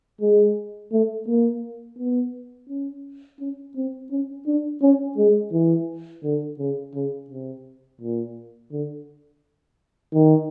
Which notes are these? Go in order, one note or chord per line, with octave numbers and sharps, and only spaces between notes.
G#3
A3
A#3
B3
C#4
C#4
C4
C#4
D4
C#4
G#3
E3
D3
C#3
C#3
C3
A#2
D3
D#3